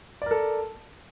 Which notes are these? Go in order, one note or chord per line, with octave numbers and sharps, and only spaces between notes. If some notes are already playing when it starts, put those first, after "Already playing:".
A4 A#4 D5